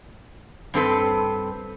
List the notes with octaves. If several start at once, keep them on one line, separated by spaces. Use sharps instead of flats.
G2 C4 A4 B4